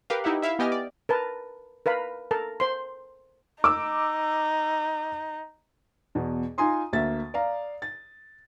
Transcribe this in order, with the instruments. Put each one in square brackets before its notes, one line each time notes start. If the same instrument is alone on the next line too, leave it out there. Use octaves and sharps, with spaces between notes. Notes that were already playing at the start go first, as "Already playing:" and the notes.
[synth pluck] G4 A#4 B4 F5
D#4 E4 G4 E5 F#5
E4 E5 F5
B3 G4 D#5 G#5 F6
D5
[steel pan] A#4 B4 A5
A#4 B4 F5 B5
A4 A#4 A5
C5 C6
[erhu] D#4 [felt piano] D6 E6
[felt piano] E2 B2
D#4 F4 G#5 A#5 C6 D#6
D2 A#3 E5 A6
D5 F5 A#5
A6